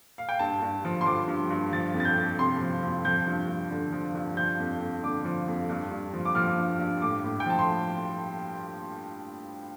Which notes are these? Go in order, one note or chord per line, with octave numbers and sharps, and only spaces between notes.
F5
G5
G2 A5
G2
F3
C6
F3 D6
G2
G2
F3 A6
F2
A6
G6
F2
C3 C6
F3
F2
F3 G6
G2
G2
D3
F3
G2
F3 G6
F2
F2
D3 D6
F3
F2
G2
G2
F3
D6
F3 F6
G2
G2
A2 D6
A2
G5
F3 A5
C6